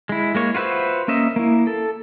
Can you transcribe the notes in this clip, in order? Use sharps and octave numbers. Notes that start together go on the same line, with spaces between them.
G#3 E4
G#3 A#3 C#5
F4 F#4 B4 C5 E5
A#3 C#4 D#5 E5
A#3 E4
A4